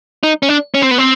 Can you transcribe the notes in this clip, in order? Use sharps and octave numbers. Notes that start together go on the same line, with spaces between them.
D#4
C#4
D4
C#4
C4
B3
C4